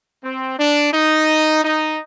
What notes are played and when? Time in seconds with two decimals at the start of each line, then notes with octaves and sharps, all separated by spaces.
0.23 C4
0.58 D4
0.93 D#4
1.63 D#4